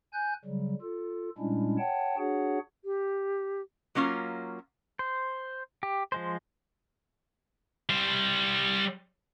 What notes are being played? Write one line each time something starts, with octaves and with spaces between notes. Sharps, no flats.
G#5 F#6 G6
C#3 F#3 G3
F4 A4
A#2 G3 G#3 C#4 D4 E4
C#5 F#5 G5 A5
D4 F#4 G#4 C#5 F#5
G4
F#3 A#3 C#4 F4
C5
G4
F3 G#3 C5
G3 C5